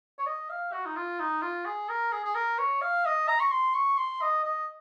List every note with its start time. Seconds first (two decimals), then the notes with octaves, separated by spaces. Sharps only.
0.19 C#5
0.26 D#5
0.50 F5
0.73 F#4
0.85 D#4
0.96 F4
1.19 D#4
1.42 F4
1.65 G#4
1.89 A#4
2.12 G#4
2.24 G#4
2.35 A#4
2.58 C#5
2.81 F5
3.06 D#5
3.28 A#5
3.40 C#6
3.52 C6
3.75 C#6
3.98 C6
4.22 D#5
4.44 D#5